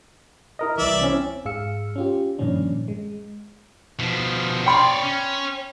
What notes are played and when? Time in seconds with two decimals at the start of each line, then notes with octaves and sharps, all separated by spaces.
0.59 E4 A#4 D#5
0.78 C2 E3 D5 E5
1.01 C4 C#4 E4
1.45 G#2 G#4 F5 E6 C#7
1.96 C#4 F4 G4
2.38 G2 A#2 D#3 F3 C#4 D4
2.88 G#3
3.99 B2 F3
4.66 C#5 D5 G5 B5 C6
5.03 C#4